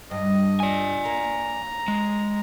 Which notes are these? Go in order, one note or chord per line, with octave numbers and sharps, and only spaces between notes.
G2 D#5
D5 G#5
A#3 A#5
G#3